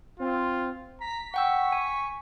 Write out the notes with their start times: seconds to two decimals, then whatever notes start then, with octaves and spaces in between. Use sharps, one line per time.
0.20 C4 F4
1.01 A#5 B6
1.34 F#5 G5 C#6 E6
1.72 G#5